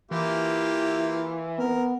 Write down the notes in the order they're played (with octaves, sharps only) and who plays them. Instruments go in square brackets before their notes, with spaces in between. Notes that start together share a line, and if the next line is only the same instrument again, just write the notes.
[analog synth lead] E3 [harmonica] A#3 F4 G4
[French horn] B3 [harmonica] A#4